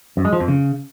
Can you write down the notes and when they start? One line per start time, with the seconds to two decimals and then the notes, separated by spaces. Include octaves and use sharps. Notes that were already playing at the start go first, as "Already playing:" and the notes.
0.17 F#2
0.25 G#3
0.33 F3
0.40 F2
0.48 C#3